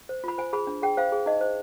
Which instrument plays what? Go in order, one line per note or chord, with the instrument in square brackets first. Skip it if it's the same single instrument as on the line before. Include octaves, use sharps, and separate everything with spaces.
[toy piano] C5
F4 B5
C5 G#5
G#4 B5
D4
G#4 G5
C5 F5
G#4
D#4 D#5
C5